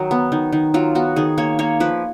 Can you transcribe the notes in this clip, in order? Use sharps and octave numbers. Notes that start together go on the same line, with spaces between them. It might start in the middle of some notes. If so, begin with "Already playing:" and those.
Already playing: D#3 F#3 D#4
B3
D#3
D#3
F#3 F4
B3 F#4
D#3 G#4
A#3 C#5
A#3 C#5
F3 B4